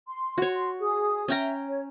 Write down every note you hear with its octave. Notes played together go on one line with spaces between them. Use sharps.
C6
F#4 C#5
C6
G#4 D#6
C#4 E5 G5 A#5
C#5